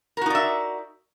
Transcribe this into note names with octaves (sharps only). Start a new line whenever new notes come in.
D#4 F#4 A#4 D5 E5